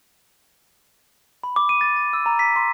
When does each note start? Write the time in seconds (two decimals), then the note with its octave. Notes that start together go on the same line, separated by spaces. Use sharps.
1.44 B5
1.56 D6
1.69 D#7
1.81 A6
1.96 A6
2.13 E6
2.26 A#5
2.39 B6
2.56 C6